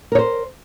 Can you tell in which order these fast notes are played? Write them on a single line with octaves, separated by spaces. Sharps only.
A#4 C#5 C5